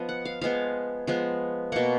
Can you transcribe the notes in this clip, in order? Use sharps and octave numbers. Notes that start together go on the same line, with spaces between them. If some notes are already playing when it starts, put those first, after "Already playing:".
Already playing: F3 B3 D#5
F#5
F5
F3 G#3 B3 F5
F3 G#3 B3
B2 A#3 F#5